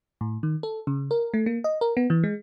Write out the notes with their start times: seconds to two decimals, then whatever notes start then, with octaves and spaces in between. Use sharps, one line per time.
0.21 A2
0.43 D#3
0.63 A4
0.87 C#3
1.11 A#4
1.34 A3
1.46 A#3
1.64 D#5
1.81 A#4
1.97 B3
2.10 E3
2.24 G#3